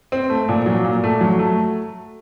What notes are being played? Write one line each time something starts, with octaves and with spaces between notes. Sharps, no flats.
C4
A3
A#2
F#3
A#2
A3
F#3
A3